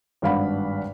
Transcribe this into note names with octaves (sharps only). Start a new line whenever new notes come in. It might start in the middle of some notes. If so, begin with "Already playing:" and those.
G#1 G2 D4 F5 F#5 B5